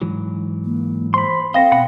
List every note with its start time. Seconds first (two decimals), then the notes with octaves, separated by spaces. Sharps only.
0.02 G#2 E3 F#3
0.65 A#3
1.14 C5 B5 C6
1.54 C4 A4 C5 D#5 F5 G5 A#6
1.72 B2 F#5 B5